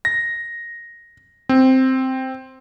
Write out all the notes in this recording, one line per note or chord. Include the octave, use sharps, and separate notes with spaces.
A#6
C4